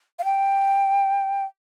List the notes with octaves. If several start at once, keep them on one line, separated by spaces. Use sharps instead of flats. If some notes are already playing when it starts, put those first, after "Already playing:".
F5
G5